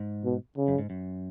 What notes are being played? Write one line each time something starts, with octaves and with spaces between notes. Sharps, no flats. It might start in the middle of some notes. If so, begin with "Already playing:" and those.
Already playing: G#2
B2
C#3
F#2
G#2
F#2